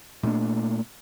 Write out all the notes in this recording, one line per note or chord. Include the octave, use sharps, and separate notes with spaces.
A#2 A3 B3 D4